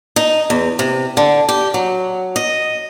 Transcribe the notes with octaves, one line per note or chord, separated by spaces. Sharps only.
D#4
E2
C3
D3
G4
F#3
D#5